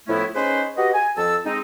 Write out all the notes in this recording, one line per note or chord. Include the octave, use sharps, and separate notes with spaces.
A2 F3 A3 B3 C#4 E4
C#4 D#4 G#4 B4 C5
F#4 G4 B4 D#5
G#5
F2 A5 E6
G#3 C4 D#4